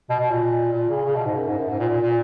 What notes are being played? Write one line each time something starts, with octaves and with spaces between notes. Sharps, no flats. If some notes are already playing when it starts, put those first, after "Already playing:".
B2
B2
A#2
A#2
C#3
C#3
B2
G#2
F#2
G#2
F#2
G#2
A#2
A#2
A#2